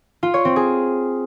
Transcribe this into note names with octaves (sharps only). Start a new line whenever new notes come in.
F4
C#5
C4
G#4